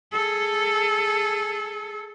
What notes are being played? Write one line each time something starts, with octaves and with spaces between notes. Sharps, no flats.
G#4 A4